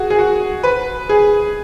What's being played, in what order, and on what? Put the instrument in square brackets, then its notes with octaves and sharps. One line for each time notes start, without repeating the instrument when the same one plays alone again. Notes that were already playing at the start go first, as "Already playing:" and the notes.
Already playing: [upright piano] F#4 G#4
G#4
F#4
B4
G#4